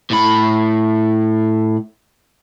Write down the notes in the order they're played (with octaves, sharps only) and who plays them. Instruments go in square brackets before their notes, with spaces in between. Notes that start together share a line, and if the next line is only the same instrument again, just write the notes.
[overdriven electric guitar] A2 B5